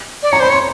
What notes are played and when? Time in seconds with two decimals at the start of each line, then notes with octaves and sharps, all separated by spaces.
0.23 D5
0.32 C#5 A#5
0.40 C5 B5
0.49 C#5 C6